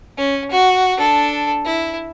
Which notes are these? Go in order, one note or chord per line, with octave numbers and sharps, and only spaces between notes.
C#4
F#4
D4 A4
E4